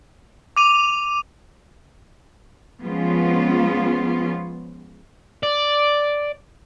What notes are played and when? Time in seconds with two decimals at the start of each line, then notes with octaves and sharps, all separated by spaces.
0.57 D6 D#7 F7
2.83 F3 G#3 B3 C#4 F4
5.43 D5